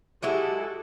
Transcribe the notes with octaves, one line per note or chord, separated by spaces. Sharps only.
F#3 G#3 E4 F#4 G4 A4